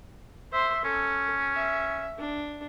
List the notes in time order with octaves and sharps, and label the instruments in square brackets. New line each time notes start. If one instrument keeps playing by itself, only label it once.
[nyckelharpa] C5 C6 [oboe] E5
[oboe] C#4 [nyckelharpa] A4
[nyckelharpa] E5
D4